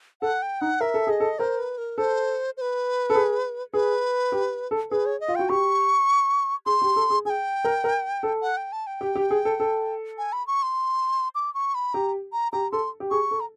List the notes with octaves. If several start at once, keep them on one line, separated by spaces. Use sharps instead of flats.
A4 F#5
G5
D#4 F#5
A#4 E5
A4
G#4 D#5
A4
A#4 C5
B4
A#4
A4 C5
C5
B4
A4
G#4
G#4 B4
G4
A4
G#4 B4
C#5
D#5
F4
F#4 G5
G4 C#6
G#4 C6
G4
A4
G#4
G#4 G#5
G5
A#4
A#4
A4
F#5
G5
A5
G5
G4
G4
G#4
A4
A4
G#5
B5
C#6
C6
D6
C#6
B5
G4 A#5
A#5
G4 A#5
A4 C6
G4
G#4 C#6
A4
A#5